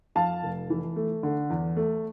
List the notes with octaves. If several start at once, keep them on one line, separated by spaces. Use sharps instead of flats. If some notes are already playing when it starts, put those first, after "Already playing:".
F2 F5 A5
F1
E3
A3
D3
E2
A3